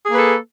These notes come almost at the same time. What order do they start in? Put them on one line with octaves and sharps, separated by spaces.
G#4 A#3 B4 A4